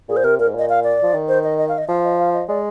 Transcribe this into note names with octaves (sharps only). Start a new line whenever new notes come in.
A#2 G#4
C5
C3 A#4
A#2 A#4
G#2
A#2 D#5
F5
D5
F3
D#3
C5
D#5
D#5
F5
D#5
F3 F5
D#5
F5
D#5
G#3 D5